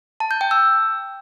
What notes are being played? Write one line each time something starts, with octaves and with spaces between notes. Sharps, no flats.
A5
G6
G5
E6